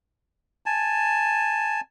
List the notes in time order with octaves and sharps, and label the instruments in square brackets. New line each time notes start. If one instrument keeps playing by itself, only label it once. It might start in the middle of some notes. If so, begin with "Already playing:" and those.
[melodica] G#5 A5